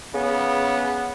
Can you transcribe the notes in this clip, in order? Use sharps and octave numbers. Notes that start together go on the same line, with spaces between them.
C#3 B3